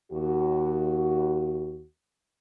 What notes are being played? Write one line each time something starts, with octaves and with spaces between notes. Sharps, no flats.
D#2 F#4